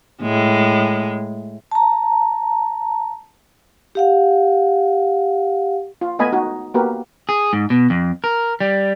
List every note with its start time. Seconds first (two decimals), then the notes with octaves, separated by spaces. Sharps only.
0.22 A2 G#3
1.71 A5 A#5
3.95 G4 F5 F#5
6.01 F4
6.19 A3 B3 D#5 G#5 B5
6.32 D#4 F#4
6.74 A#3 B3 F#4 G4 A#4 B4
7.29 G#4
7.53 G#2
7.70 B2
7.90 F2
8.24 A#4
8.60 G3